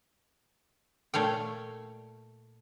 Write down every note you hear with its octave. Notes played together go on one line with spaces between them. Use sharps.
A#2 A3 C#5 F5 G5